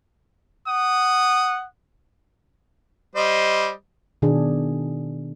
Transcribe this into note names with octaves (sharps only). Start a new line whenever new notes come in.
F#5 D#6
G3 C5 D#5
B2 D#3 D4 G#4